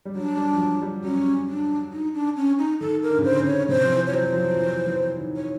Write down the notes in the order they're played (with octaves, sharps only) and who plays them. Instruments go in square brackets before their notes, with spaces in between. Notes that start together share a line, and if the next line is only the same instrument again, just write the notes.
[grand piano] G3
[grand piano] F#3 [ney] D4
[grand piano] G3
F3
F#3
G3
[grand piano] F#3 [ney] C#4
[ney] D4
D#4
D4
C#4
D#4
[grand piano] D#3 [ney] A4
[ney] A#4
[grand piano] D3
C#3
[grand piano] D3 [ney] C5
[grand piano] C#3
[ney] C#5
[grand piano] C3 [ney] C5
[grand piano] F3
E3
[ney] C#5
[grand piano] F#3 [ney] C5
[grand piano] F3
F#3
F3
E3
E3
D#3
[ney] C#5